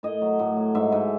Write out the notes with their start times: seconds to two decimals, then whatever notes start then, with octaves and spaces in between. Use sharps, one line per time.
0.03 A2 D#5
0.21 F#3
0.39 A2
0.57 F#3
0.75 G#2 E5
0.92 G#2